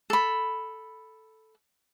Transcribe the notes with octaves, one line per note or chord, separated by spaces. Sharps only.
A4 B5